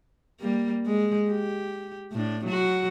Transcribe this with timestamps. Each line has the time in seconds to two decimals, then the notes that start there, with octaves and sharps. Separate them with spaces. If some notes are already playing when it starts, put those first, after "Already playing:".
0.40 G3 A#3
0.86 G#3
1.31 G4
2.12 A2 D4
2.45 F#3 F#4